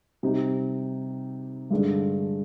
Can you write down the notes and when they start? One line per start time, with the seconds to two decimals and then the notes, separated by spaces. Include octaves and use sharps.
0.23 C3 G3 C4 D#4 G4
1.71 G2 D3 G#3 D4